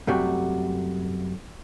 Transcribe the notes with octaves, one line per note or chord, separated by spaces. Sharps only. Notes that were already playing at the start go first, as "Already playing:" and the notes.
F#2 C3 G3 A3 F#4